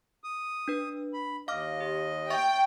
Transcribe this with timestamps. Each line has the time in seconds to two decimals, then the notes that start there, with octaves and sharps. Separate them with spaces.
0.24 D#6
0.68 D4 B4
1.13 B5
1.48 D#2 D#5 F5 D6 F6
1.80 G4
2.30 E5 G5 C#6 A6